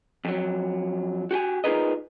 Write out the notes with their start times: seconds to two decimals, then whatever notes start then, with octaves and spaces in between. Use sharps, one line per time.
0.25 F2 F#3
1.31 F#4 G4 G5 G#5
1.64 D#4 F4 G#4 A#4 B4 D#5